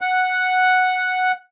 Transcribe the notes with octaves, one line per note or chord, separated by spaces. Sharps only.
F#5